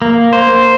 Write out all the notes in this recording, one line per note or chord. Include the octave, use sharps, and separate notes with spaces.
A#3
C5